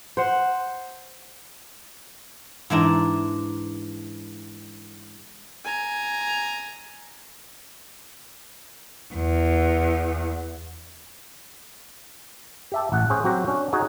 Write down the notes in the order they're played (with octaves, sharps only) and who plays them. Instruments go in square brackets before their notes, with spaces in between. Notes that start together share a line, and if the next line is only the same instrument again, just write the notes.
[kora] C5 F#5
[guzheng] G#2 E3 D4 A#5
[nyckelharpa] G#5 A#5
[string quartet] E2
[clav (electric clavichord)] G4 E5 A5
A1 F#5
C#4 G#4 C5
F#3 C4 F#4 G4
C#4 D4
D#4 F#4 G#4 C#5